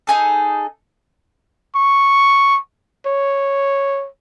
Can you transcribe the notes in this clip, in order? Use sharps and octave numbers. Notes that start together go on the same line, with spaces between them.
D#4 G#4 A4
C#6
C#5